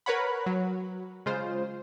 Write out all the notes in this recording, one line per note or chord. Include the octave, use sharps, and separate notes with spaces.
A#4 B4 C#5 F#5 B5
F#3
C#3 G#3 F4 C5